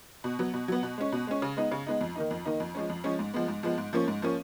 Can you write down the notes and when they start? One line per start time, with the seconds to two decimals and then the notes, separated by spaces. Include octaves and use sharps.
0.24 B2
0.39 F#3 B3
0.54 B2
0.68 F#3 B3
0.83 B2
0.98 G#3 C#4
1.12 B2
1.27 G#3 C#4
1.42 C#3
1.57 G#3 B3 D#4
1.71 C#3
1.87 G#3 B3 D#4
2.01 F2
2.16 D#3 A#3 D#4
2.31 F2
2.45 D#3 A#3 D#4
2.60 F2
2.75 F3 G#3 C#4
2.90 F2
3.04 F3 G#3 C#4
3.19 G#2
3.34 F3 G#3 B3
3.48 G#2
3.63 F3 G#3 B3
3.78 G#2
3.93 F3 A#3 C#4
4.08 G#2
4.22 F3 A#3 C#4